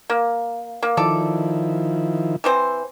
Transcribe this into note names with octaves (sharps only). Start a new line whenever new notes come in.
A#3
A#3
D#3 F3 E4 A4 D5
E3 C4 C5